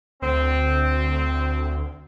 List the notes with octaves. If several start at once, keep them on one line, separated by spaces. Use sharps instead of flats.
D2 C4